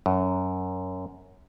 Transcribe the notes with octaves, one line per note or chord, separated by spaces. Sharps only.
F#2